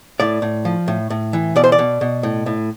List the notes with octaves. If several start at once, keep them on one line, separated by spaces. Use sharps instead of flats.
A2 D5
A2
F3
A2
A2
E3
B2 D5
C5
D5
B2
B2
A2
A2